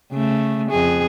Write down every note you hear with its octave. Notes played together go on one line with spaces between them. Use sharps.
C#3 A3
F2 G#4